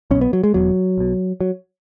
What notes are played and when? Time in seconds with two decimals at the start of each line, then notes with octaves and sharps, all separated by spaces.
0.11 B1 B2 C#4
0.21 B3
0.33 F#3
0.43 G#3
0.54 E1 E2 B2 F#3
0.98 B1 B2
1.41 F#3